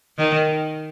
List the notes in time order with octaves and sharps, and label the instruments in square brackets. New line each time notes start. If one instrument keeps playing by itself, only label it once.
[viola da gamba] D#3